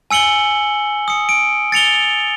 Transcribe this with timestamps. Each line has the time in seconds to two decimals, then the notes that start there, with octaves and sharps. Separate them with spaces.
0.11 G#5 E6 C#7 F#7 G7
1.08 D#6 C#7
1.29 D7
1.72 A6 C#7 F7 G7